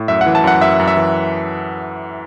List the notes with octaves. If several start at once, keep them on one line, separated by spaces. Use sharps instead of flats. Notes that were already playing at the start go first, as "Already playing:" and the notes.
Already playing: A2
F#2 E5
F#5
E3
A5
F#2 F#5
F#2 E5
F#2
E5
E3